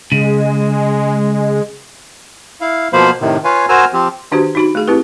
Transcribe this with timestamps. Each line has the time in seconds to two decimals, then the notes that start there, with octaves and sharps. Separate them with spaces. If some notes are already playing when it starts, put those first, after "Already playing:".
0.12 C#3 G#3
2.61 E4 F5
2.93 B2 F3 A#3 C5 F5 B5
3.21 A2 C3 D#3
3.44 F4 B4 C#5 F5 G#5
3.69 F#4 A#4 C5 G#5 A#5 E6
3.93 F3 C4 G4
4.32 D#3 D4 F#4 G4 C5
4.55 D#4 F#4 B5
4.75 A3 G#4
4.88 C4 E4 G4 B4